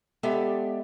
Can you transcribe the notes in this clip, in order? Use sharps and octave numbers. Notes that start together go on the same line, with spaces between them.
G#3 B3 G4 A4 D5 E5